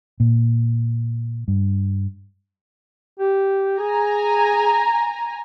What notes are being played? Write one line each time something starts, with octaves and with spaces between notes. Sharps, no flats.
A#2
G2
G4
G#4 G#5 A#5